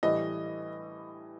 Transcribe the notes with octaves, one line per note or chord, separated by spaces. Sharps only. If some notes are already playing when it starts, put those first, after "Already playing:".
A2 E3 G3 D#5